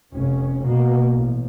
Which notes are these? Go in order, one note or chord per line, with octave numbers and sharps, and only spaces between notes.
F1 C#4
B2 A#3
A1